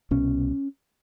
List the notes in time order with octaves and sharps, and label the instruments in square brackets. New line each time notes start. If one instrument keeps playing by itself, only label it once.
[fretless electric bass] C2 B2 C#4